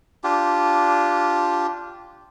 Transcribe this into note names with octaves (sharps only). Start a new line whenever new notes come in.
D4 F4 G4